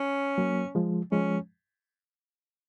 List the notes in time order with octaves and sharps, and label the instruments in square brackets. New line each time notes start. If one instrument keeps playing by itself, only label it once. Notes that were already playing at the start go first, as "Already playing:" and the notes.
Already playing: [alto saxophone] C#4
[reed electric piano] F#3 A#3
F3 G#3
[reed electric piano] F3 G#3 [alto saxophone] C#4